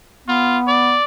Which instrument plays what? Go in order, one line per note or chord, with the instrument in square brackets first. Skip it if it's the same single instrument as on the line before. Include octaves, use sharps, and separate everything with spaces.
[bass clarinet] B3 [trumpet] F4
[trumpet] D5